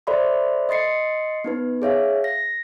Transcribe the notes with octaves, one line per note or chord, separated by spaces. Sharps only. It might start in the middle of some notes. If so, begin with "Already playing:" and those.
A4 C5 D5 E5 B5 C6
D#5 C6 A6 C7 C#7
B3 D#4 B4
G#4 C#5 E5 F5
A#6